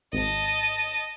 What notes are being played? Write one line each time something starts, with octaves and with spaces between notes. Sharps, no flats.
G#1 D#5 A5